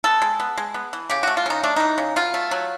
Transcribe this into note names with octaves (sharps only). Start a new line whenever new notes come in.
B3 A4
G#3
B3
G#3
B3
E3
C#3 G4
A3 F#4
F4
C#3 D#4
A3 D4
E3 D#4
C#3
B2 F4
A3
F#3